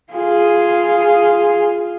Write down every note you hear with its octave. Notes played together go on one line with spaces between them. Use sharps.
F4 G#4